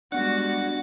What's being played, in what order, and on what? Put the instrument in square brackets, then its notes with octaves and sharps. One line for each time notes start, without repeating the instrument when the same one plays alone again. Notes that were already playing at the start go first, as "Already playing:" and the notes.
[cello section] G3 G#3 F#4 [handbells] B3 F#6 [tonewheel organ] D4 D5 [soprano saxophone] F#5